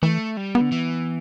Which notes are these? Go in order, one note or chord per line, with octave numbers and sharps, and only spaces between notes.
E3 A3
G3
B3
D3
E3